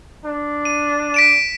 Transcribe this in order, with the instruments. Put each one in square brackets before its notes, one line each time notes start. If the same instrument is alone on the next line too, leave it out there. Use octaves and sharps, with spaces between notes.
[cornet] D4
[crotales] D#7
B6 D7 E7